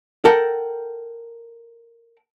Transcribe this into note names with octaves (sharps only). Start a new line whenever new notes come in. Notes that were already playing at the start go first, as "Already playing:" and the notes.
A4 A#4 F#5 G5